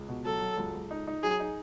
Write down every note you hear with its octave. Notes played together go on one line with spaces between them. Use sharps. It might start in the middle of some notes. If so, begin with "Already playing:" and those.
Already playing: C#2
B2
F#3 A4
F#3
C#2
C#2
D#4
D#4
F#3 G#4
D#4